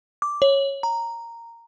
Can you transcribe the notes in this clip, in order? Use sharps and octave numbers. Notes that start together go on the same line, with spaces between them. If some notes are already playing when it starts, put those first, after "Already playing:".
D6
C#5
A#5